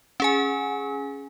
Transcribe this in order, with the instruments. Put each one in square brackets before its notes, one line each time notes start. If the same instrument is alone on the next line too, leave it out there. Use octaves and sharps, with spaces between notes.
[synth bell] C#4 G#4 G#5